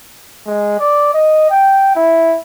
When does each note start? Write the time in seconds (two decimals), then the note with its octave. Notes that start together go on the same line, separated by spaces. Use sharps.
0.47 G#3
0.80 D5
1.14 D#5
1.50 G5
1.95 E4